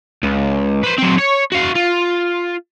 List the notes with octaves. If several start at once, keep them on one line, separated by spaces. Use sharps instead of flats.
C#2
B4 C5
F#3 C4
C#5
F#4 F5
F4